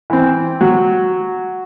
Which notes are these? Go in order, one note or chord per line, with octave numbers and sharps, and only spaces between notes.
E3 C4
F#3